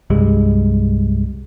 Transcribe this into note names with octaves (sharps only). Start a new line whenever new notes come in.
C2 G2 G3 G#3